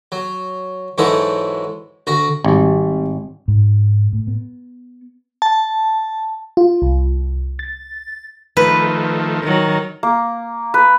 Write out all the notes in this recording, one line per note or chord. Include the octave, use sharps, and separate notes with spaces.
F#3
G#2 E3 F#3 G#3 A4 F#5
D2 F#4 A#5
G#1 G3
G#2
A2
B3
A5
F4
C2
A6
D#3 F3 A3 B4
D#3 F#3
A#3
B4